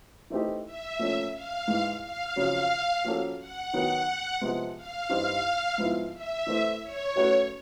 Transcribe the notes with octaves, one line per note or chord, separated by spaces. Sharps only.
E3 A3 C4 D#4 G4
E5
A#2 F3 A3 C#4
F5
G#2 E3 G#3
F5
F2 C#3 F#3
F3 A#3 C#4 F#4 A4
F#5
D#3 F#3 B3
C3 F3 G#3 B3
F5
G2 E3 G3 C4 D#4
G#2 F3 G#3 B3 E4
E5
E3 A3 C4
C#5
F#3 A3 C#4 F#4 B4